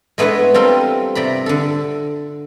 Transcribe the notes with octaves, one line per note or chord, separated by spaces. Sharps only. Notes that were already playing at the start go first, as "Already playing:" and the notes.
G#3 A3 B3 D4 E4 B4
G3 C4 F4 A4 A#4
C3 D5 A#5 B5
D3 A4